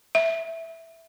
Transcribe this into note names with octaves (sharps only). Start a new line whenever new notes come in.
E5